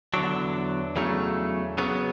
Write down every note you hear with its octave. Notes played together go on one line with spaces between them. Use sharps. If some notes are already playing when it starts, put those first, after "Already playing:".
E2 D3 F#3 D4
E2 C#3 F#3 A3
C#3 F#3 B3